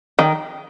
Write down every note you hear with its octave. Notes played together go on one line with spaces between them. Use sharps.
D#3